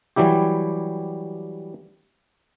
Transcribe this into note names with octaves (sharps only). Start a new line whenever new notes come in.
E3 F#3 G3 E4 G4